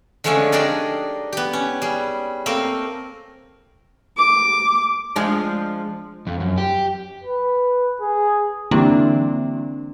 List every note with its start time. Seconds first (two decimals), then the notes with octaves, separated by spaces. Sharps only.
0.24 D3 F3 G#3 A3 C#4 D4
0.52 D4 D#4 G4 G#4 A#4 D5
1.33 B3 G4
1.53 C#4
1.82 G3 G#4
2.46 A3 A#3 C4 A#4
4.17 D6
5.16 F3 G#3 D4
6.27 F2
6.40 F#2
6.58 G4
7.24 B4
8.01 G#4
8.71 D3 E3 G3 A#3 C4 D4